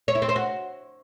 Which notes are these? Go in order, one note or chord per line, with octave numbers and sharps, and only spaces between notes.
C#5
E4
C4
C5
F#4